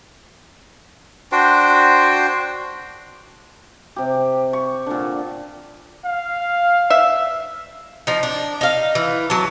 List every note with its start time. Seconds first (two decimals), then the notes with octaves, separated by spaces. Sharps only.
1.32 D4 F#4 C5 G5
3.96 C3 G4
4.53 C#6
4.86 A#2 D3
6.06 F5
6.90 E5
8.07 F3 D#4
8.23 D4
8.61 D#4 F5
8.95 E3
9.30 F#3 A5